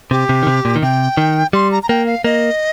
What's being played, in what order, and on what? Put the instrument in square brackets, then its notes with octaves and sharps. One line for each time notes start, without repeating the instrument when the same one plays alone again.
[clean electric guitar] C3 [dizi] G4
[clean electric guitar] C3
D#3
C3
A#2
D#3
[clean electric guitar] C3 [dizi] G5
[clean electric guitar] D#3
[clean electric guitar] G3 [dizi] C6
[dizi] A#5
A#5
[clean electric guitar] A#3 [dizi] G5
[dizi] F5
[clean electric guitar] A#3 [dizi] D#5